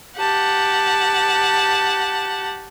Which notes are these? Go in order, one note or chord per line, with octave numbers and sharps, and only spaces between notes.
G4 F#5 A5